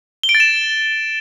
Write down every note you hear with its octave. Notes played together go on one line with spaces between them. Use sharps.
G7
D7
A6
E7